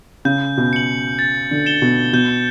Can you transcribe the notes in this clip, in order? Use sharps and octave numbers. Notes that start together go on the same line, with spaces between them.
C#3 G6
B2
C#7 F#7
A6
D3
C#7 E7 G7
B2
B2 G6